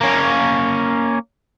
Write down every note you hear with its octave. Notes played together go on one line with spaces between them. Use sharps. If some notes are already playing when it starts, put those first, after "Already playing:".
A#3 C#4